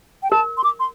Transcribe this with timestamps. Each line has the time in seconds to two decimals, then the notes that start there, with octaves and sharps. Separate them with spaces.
0.23 G5
0.31 A#4 A5
0.57 C6
0.64 D6
0.80 C6